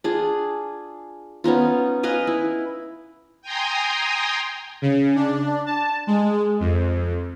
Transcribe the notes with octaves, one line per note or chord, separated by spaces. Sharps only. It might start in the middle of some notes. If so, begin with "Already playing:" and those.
D4 F4 G#4
B3 C#4 D#4 F4
B4 D#5 F5 G#5
E4
G5 G#5 A#5 C6 D#6
C#3
D4
A5
G#3
F2